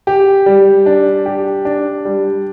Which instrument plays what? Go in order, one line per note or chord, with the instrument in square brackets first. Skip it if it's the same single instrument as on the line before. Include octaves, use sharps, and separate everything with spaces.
[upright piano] G4
G3
D4
G4
D4
G3